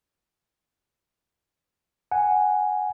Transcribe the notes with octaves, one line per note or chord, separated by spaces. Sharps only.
F#5 G#5